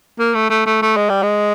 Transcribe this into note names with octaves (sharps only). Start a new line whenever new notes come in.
A#3
A3
A3
A3
A3
G#3
G3
G#3